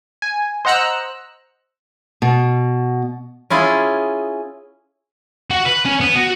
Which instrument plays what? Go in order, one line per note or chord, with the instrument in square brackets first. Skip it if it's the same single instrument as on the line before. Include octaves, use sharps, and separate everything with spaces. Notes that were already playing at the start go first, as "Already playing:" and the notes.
[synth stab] G#5
C5 D#5 F#5 A#5 E6 F#6
[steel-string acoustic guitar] B2
[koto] C#4 E4 F4 G#4
[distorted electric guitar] F#4 F#5
B4
C#4
B3
F#4